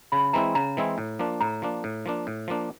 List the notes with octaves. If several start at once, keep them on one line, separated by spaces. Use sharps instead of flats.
C#3 B5
E3 G#3 C4 E4 A#5
C#3 A#5
E3 G#3 C4 E4
A2
F3 A#3 D4
A2 A#5
F3 A#3 D4
A2
F3 A#3 D4
A2
F3 A#3 D4